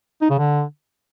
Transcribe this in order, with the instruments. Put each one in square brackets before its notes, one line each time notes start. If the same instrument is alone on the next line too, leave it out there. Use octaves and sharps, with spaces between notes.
[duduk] D#4
C#3
D3